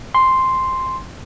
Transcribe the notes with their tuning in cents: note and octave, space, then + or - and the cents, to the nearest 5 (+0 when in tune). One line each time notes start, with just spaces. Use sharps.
G#5 -10 C6 +0